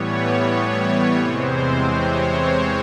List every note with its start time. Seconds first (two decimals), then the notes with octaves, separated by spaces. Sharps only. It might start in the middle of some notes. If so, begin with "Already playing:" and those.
Already playing: A2 E3 G3 B3 C#5
1.16 E2 C3 E3 G#3 C4 C5
1.89 C#5